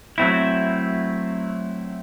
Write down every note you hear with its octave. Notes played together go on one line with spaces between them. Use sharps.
F#3 A3 C4 E4